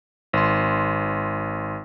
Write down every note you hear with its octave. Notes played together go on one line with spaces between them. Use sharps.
G#1 C6